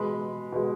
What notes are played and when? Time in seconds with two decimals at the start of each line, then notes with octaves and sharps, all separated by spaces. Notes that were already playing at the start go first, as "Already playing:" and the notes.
Already playing: B2 G#3 B5
0.52 B2 G#3